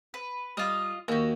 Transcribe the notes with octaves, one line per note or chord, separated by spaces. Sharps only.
B4
G3 F4 D#5
D#2 F#4 G4